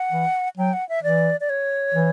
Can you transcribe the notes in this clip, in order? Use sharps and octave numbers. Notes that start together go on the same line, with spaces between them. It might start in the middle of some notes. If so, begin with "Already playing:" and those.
Already playing: F#5
E3
F#3 G5
F#5
E5
E3 D5
D5
C#5
E3